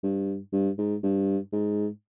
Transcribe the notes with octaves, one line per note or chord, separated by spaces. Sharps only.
G2
G2
G#2
G2
G#2